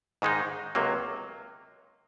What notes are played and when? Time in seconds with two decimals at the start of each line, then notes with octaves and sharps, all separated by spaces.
0.22 G#2 D#3 G#3 D#4
0.75 C#2 C3 F#3 A#3